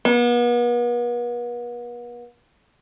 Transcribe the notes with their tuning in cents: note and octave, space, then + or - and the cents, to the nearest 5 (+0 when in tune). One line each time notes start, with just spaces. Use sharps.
B3 -40